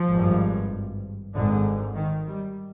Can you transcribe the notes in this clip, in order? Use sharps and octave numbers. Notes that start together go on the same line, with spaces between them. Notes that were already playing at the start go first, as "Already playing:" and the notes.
Already playing: F3
G#1 G2
G#1 G#2 D3
D#3
G3